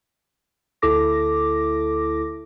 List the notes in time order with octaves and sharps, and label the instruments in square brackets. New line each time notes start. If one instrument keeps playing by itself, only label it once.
[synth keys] D2 E4 A4 D6 A#6